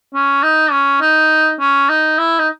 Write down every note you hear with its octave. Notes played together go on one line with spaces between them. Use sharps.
C#4
D#4
C#4
D#4
C#4
D#4
E4
D#4